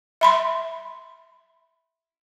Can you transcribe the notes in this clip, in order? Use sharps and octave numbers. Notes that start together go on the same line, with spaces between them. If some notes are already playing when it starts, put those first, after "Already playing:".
E5 B5 C6